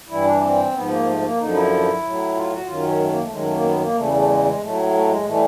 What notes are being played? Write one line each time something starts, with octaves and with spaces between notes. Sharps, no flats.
G2 E3 G3 E4
D4
C4
G#2 F3 B3
A#3
A3
A#3
F#2 D3 F3 D#4
E4
A2 F#3
F4
F#4
F#2 D#3 F#3 F4
C#4
A3
A#3
A3
F#2 D#3 F#3 G#3
A3
A#3
B3
A#3
E2 C#3 E3 G3 A3
A3
G#3
G#3
A2 F#3 A3
A3
G#3
A2 E3 G3 A3